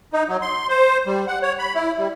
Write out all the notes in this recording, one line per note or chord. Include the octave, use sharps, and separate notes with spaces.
D#4
F#3
C6
C5
G3
F#5
C#5
B5
E4
G3